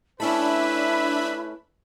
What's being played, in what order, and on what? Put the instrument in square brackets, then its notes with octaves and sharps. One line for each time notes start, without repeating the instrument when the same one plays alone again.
[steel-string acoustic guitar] A3 C#4 [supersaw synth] D4 E5 B5 [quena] E4 [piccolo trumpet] B4